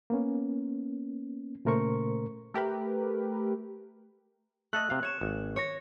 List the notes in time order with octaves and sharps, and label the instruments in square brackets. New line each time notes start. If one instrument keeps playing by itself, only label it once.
[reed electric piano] A#3 B3 C#4
A#2 C#3 A3 A#4 C5 C#6
[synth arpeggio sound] A3 G4 A#4 B4
[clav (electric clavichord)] A3 A4 D#5 [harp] F#6
[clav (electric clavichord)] C3 F5
[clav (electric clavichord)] C#5 [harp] C#6 E7
[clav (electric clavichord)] G#1
[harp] C#5 C#6 A#6